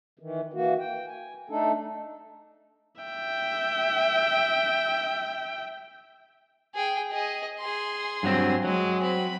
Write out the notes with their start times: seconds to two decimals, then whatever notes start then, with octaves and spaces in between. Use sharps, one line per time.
0.19 D#3 E3
0.53 E3 A#3 F#4
0.79 G5
1.07 G#5
1.49 A3 D4 D#4 A4
3.02 E5 G5
6.75 G#4 G5
7.11 G#4 D#5
7.60 G#4 C6
8.23 G2 F#3 C4
8.64 F#3 G#3 D#5
9.02 C4 B5